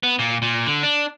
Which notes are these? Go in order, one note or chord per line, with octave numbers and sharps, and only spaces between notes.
B3
A#2
A#2
D3
D4